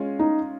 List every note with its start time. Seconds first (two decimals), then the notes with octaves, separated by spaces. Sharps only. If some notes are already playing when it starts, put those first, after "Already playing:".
Already playing: G#3 C#4 F4
0.19 D#4